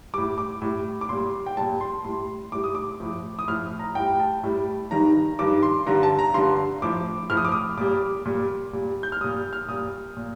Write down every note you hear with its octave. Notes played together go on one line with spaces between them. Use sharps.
A2 G3 D6
D6
A2 G3
D6
A#2 G3 C6
G5
A#2 G3 A5
C6
A2 G3 C6
A2 G3 D6
D#6
D6
A2 F3
D#6
A2 F3 F6
A#5
A2 G3 G5
A5
A2 G3
G2 D#3 G3 A#5
G2 D#3 G3 D6
C6
G2 D3 G3 A#5
A5
A#5
G2 D3 G3 C6
A2 F3 D6
A2 F3 F6
D#6
D6
D#6
A#2 G3 D6
A#2 G3
A#2 G3
G6
F6
A#2 G3 D#6
F6
A#2 G3 D#6
A#2